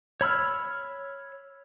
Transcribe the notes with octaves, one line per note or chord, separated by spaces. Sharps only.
C#5 B5 E6 F6